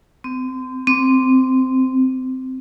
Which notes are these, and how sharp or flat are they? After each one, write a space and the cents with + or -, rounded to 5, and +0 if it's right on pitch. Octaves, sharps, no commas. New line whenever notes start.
C4 -30
C4 -10